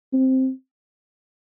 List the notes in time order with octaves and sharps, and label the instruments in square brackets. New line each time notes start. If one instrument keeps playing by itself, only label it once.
[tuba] C4